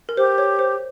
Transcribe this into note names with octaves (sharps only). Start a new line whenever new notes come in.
A#4
G4 C5
C#5
C5